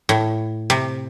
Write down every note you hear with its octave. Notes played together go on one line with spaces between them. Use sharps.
A2
C3